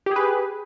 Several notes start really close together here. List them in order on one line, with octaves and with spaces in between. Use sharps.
G4 G#4 B4